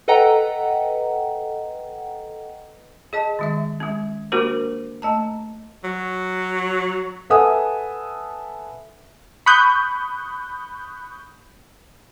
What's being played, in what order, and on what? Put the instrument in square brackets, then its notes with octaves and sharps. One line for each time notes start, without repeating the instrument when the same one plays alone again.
[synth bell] A4 B4 D#5 F#5 G5 A#5
[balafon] G#4 D#5 A5
D#3 G#3 E5
G#3 C#4
A#3 D4 F#4 G4 A#4 C5
A3 A5 A#5
[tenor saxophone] F#3
[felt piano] A4 B4 E5 F#5 G#5 D#6
[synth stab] B5 C#6 D#6 F#6 G6